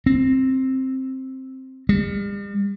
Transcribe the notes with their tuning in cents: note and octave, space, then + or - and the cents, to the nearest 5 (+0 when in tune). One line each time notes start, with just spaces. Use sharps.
C4 +5
G3 +45